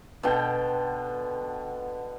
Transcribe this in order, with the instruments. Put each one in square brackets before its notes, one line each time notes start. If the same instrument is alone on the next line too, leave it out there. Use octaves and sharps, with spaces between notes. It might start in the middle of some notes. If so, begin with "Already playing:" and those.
[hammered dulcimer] B2 D3 G5